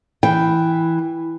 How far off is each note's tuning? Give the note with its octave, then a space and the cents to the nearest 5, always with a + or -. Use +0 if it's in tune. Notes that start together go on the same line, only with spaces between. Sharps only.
E3 +0 G5 +0